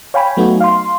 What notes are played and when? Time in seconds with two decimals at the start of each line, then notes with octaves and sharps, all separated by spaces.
0.14 C#5 F5 G5 G#5 B5
0.37 F#3 A3 B3 D#4 F#4
0.60 F5 C6